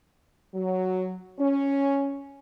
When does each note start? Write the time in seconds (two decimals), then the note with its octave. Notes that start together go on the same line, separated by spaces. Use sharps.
0.55 F#3
1.39 C#4